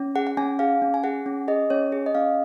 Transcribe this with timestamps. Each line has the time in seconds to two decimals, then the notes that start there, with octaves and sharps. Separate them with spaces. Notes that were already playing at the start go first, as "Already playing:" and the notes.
Already playing: C#4
0.15 G#4 F#5
0.27 F#5
0.37 C#4 G#5
0.59 G#4 F5
0.82 C#4
0.94 G#5
1.04 G#4 F#5
1.26 C#4
1.48 G#4 D#5
1.70 C#4 C#5
1.92 G#4
2.06 D#5
2.15 C#4 F5